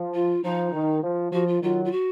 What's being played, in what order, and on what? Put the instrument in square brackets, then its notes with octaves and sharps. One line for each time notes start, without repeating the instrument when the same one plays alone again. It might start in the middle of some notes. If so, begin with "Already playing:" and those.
Already playing: [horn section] F3
[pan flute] F4
[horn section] F3 [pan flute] D#4
[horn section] D#3
F3
[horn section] F3 [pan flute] F#4
[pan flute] F4
[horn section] D#3 F#3 [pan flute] F4
[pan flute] F4
F#4